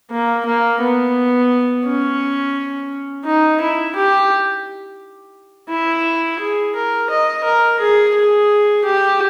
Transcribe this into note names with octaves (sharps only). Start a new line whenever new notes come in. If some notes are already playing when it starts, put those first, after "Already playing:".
A#3
A#3
B3
C#4
D#4
E4
G4
E4
G#4
A#4
D#5
A#4
G#4
G#4
G4